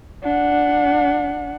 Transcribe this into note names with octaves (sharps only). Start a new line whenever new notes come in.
D4 F#5